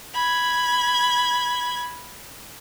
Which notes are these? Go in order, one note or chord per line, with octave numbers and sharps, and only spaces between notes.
B5 G#6